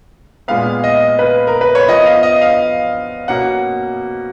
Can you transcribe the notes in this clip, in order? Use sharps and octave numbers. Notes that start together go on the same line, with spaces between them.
A#2 G#3 B3 F5
D#5
B4
A#4
B4
C#5
F3 B3 D#5
F5
D#5
F5
B2 A#3 C#4 F#5